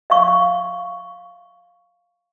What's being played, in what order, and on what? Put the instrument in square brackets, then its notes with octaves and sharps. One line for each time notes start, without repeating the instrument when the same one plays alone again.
[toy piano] E5 F5 C#6